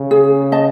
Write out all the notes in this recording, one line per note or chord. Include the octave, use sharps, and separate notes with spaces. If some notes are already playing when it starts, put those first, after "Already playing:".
Already playing: C#3
G#4
D#5 A5